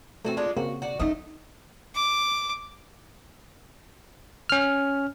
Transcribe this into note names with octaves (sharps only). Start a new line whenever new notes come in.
E3 A3 C4 F#4 A4
G#3 D4 F4
C#3 A#3 C4 F#4
F#4 D5
A3 C#4 D#4 D#5
D6
C#4 F6